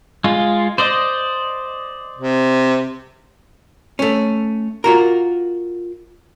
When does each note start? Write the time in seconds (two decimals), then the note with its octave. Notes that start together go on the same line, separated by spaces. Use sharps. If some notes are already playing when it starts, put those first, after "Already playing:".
0.24 G#3 F4
0.78 C5 D5 D#5
2.16 C3
3.99 A3 C#4
4.84 F4 F#4 A#4